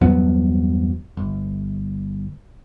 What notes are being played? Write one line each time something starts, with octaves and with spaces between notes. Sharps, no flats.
E2 G2 F#3 B3
G1